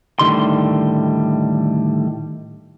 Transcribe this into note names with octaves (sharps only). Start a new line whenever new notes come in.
A2 D3 D#3 G3 C6